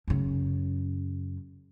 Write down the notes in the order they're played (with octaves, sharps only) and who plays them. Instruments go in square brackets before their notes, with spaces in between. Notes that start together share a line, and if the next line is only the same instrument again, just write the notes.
[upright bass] F#2 C#3